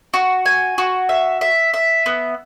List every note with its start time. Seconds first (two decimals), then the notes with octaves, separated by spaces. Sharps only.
0.14 F#4
0.46 G#5
0.78 F#4
1.09 E5
1.41 E5
1.74 E5
2.06 B3